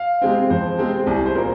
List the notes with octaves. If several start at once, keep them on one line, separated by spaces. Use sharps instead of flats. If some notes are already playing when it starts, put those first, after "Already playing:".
Already playing: F5
C3 G#3 C4
F2 C5
C3 G#3 C4
C2 G#4
C5
A#2 A#3 A#4